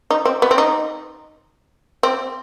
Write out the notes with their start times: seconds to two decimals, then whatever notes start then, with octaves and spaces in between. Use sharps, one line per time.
0.10 D#4
0.25 C4
0.42 B3
0.51 C4
0.58 D#4
2.03 C4